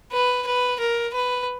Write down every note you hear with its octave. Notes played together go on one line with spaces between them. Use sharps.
B4
B4
A#4
B4